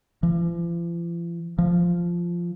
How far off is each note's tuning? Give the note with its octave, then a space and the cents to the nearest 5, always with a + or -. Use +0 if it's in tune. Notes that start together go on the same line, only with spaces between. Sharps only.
F3 -45
F3 -10